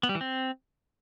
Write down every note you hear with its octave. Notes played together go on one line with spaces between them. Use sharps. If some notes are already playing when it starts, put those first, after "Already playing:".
B3
G3
E3
C4